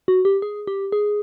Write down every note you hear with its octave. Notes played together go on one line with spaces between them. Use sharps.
F#4
G4
G#4
G4
G#4